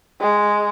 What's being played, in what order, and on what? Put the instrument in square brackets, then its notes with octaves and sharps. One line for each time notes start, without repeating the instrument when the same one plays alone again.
[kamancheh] G#3